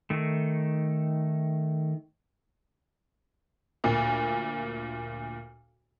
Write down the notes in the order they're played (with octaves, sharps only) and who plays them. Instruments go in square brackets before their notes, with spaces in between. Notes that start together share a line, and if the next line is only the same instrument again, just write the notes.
[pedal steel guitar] D#3 A3
[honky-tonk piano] D2 A#2